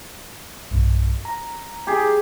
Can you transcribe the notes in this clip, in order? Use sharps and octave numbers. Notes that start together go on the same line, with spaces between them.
B1 G2
A#5
G4 G#4